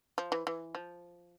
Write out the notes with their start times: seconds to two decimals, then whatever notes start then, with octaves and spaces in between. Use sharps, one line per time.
0.18 F3
0.32 E3
0.47 E3
0.75 F3